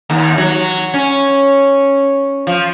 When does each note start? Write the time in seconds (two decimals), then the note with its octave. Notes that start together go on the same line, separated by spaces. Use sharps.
0.10 D#2
0.38 F#3
0.94 C#4
2.47 F3